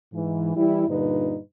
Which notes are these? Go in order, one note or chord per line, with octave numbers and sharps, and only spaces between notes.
G#2 E3
E3 G3 E4
G2 A#2 D3 D#4 B4